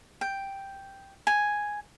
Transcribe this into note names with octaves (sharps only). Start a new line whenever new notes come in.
G5
G#5